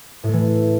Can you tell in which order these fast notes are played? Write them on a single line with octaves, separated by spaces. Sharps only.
A2 A3 E3